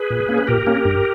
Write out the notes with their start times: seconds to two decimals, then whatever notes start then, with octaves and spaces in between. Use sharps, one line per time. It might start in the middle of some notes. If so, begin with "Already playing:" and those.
Already playing: G#4 B4
0.10 A#2
0.29 A#3 C#4
0.38 B4
0.47 A#2 G4 A#4
0.66 A#3 C#4
0.85 G2